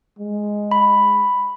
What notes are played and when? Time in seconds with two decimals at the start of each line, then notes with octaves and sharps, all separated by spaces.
0.19 G#3
0.71 B5